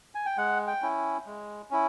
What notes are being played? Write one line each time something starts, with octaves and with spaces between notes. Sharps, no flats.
G#5
G5
G#3 F#5
G5
C#4 E4
G#3
C#4 E4